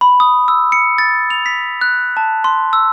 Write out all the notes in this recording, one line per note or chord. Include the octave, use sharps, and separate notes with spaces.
B5
D#6
E6
C#7
A6
F7
B6
F#6
A5
C6
E6